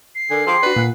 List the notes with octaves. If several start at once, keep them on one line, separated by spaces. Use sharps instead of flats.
C7
D3 A4 A#4 G#5
F3 G#4 A4 C5 G5 C6 D6
D4 F#4 B4
A#2 F#5